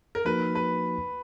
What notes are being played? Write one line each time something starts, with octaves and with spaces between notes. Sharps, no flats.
A#4
F3 A#3 D#4 F#4 B4
B4